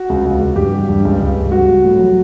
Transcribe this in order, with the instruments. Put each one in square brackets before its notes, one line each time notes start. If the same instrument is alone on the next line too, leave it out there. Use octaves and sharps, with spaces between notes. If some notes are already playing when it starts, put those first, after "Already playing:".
Already playing: [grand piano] F#4
C#2
C#2
C#2
G2 G4
G3
G2
C#2
C#2
C#2
G3 F#4
G3
A2
F#3